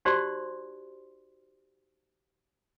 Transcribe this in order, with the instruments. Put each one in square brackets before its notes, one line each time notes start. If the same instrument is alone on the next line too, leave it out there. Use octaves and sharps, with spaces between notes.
[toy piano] D#4 F#4 G4 C5 D5 C6